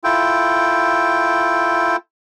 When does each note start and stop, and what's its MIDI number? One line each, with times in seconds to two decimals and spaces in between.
0.04 1.96 64
0.04 1.96 65
0.04 1.96 69
0.04 1.96 79